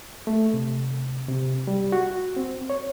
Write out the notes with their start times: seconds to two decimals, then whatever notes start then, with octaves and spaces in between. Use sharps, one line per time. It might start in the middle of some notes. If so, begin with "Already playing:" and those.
0.27 A3
0.53 C3
1.29 C3
1.67 G3
1.92 F#4
2.36 C4
2.70 C#5